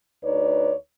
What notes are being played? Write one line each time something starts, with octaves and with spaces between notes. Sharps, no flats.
D2 D#4 B4 C#5 D5